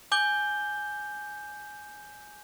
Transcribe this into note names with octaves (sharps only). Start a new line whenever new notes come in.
G#5 D6 G6 G7